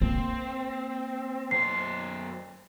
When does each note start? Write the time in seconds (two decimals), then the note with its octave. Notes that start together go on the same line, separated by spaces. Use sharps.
0.02 A#3 C4
1.51 F#2 C5 C7